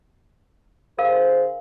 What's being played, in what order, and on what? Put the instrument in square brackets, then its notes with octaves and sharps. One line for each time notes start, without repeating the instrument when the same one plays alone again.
[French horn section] D3 G#4 C5 [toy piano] A#4 F5